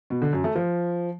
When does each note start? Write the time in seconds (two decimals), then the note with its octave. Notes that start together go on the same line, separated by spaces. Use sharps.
0.10 B2
0.22 D3
0.33 F#2
0.44 A3
0.55 F3